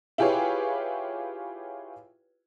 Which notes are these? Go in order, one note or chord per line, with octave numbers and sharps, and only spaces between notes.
E4 F4 G4 G#4 B4 C#5